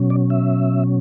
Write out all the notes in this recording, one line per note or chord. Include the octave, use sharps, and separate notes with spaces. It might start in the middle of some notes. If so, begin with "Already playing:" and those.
Already playing: B2 F#3 C#4
D5
E5